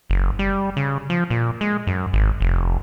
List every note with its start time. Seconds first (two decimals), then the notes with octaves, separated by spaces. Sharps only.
0.10 F#1
0.39 G3
0.77 C#3
1.10 F3
1.30 A#2
1.61 G#3
1.87 F#2
2.13 G#1
2.41 F1